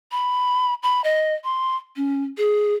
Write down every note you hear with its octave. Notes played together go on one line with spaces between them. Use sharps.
B5
B5
D#5
C6
C#4
G#4